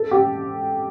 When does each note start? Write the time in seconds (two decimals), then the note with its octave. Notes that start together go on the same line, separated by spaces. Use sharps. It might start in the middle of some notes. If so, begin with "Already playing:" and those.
Already playing: A4
0.11 G4